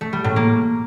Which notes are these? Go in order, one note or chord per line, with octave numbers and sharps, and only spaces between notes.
A3
G3
A2
A#3